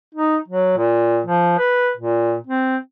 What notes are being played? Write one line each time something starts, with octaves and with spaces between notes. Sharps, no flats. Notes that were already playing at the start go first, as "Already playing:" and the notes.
D#4
F#3
A#2
F3
B4
A#2
C4